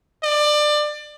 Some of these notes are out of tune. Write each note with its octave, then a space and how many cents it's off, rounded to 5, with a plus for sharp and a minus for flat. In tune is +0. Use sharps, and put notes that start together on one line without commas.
D5 +25